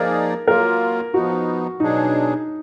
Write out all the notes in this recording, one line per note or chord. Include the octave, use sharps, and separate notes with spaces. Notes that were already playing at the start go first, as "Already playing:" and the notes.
Already playing: F3 A#3 D#4 G#4 A#4 D5
F#3 A#3 F4 A#4
F3 B3 D#4 F#4
B2 F#3 D4 D#4 G#4